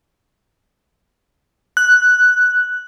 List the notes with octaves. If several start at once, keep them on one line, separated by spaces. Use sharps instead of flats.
F#6